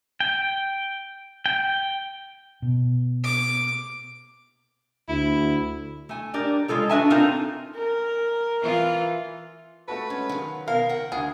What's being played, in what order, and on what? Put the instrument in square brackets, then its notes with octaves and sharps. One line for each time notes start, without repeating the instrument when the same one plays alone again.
[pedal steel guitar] G5
G5
[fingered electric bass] B2
[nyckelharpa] D6
[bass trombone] D2 [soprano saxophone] E4
[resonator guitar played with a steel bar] A3 G#5
D4 G4 A#4 D5
G#3 F4 A4 C#5
D4 F#4 B4 E5 G#5 A5
C4 D4 D#4 F4 A4 A#4
[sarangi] A#4
[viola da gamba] E3 F4
[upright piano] A3 F#4 A4 [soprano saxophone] B4
[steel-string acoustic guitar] G#3 [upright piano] C#4
[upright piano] D#3 [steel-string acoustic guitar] F#3 F4
[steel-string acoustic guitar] B2 [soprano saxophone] A#4 [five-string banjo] F5
[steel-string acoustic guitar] F#5 G5
[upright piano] D2 [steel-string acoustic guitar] D#3 [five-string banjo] G#4